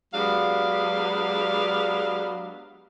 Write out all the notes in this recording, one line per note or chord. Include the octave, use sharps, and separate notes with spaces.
F#3 G#3 B3 D4 G4 F5